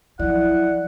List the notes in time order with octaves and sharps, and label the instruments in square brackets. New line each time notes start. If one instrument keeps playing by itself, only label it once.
[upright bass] F3 F#3 [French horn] E4 [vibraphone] D5 [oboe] F#5